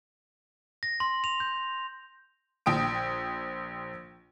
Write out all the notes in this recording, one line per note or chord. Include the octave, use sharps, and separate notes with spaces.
A#6
C6
F7
G6
A#1 G5 D#6 D7